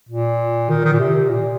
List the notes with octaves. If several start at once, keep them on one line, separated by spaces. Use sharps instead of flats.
A#2
D#3
D#3
A#2
C3
A#2